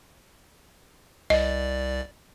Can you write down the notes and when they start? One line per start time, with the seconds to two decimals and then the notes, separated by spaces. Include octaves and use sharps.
1.30 C2 D5 D#5